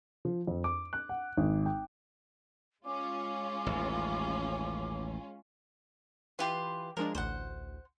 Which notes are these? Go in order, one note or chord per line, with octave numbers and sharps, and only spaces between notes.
F3
F2
D6
F#6
F#5
G#1
G5
G#3 C#4 F4 D6
A1 D#2
E3 F4 G4 B4 C6
F3 G#3 D4 A#4
A1 D2 C5 F#5